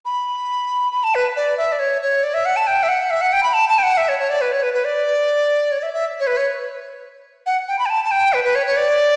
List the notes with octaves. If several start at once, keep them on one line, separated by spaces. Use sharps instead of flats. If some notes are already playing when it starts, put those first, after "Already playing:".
B5
B5
A5
B4
D5
E5
D5
C#5
C#5
D5
E5
F#5
A5
G5
E5
F#5
E5
F#5
G5
B5
A5
A5
G5
F#5
E5
C#5
C#5
D5
B4
C#5
B4
B4
D5
C#5
D5
E5
E5
C#5
B4
C#5
F#5
G5
B5
G5
A5
A5
G5
B4
B4
C#5
C#5
D5